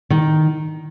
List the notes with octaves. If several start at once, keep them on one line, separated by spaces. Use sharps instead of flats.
D#3